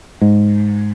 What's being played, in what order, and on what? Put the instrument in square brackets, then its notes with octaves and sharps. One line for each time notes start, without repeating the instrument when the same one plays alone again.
[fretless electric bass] G#2